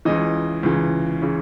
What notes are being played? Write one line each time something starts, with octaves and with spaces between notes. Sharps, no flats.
C#2 C#3 E3 D#5
C#2 C#3 E3
C#3 E3